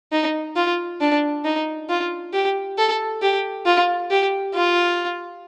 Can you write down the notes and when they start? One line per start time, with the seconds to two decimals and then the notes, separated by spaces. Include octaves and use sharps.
0.12 D#4
0.56 F4
1.01 D4
1.45 D#4
1.89 F4
2.33 G4
2.78 A4
3.22 G4
3.66 F4
4.11 G4
4.54 F4